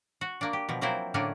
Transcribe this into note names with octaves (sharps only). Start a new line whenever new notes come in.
F#4
A#3 D4
G4
B2 F3
F3 F#3 A#3 C4 E4 C5
A2 D3 A#3 C#4 D4 G#5